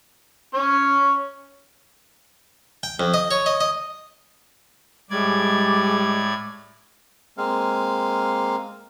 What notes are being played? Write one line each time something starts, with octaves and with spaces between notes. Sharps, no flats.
C#4 C#5
G5
F2
D#5
C#5
D#5
D#5
A2 G3 G#3 D5 D6 G#6
G#3 A#3 C4 F5